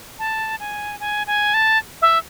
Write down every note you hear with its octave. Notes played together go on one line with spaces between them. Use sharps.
A5
G#5
G#5
G#5
A5
E5